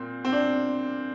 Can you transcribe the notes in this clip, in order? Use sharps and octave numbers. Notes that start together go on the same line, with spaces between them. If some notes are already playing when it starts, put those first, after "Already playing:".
Already playing: A#2 C4
C4
D4